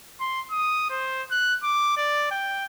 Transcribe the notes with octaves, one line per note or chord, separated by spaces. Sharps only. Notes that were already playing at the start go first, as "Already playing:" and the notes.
C6
D#6
C5
F#6
D6
D5
G5